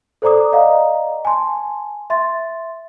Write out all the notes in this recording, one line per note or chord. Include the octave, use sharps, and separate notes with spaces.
A4 C5 D5 A#5 D6 D#6
D5 D#5 F5 F#5 A#5
G#5 A5 C6
E5 C6 A6